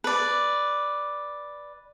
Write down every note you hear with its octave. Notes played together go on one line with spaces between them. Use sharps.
B4 D5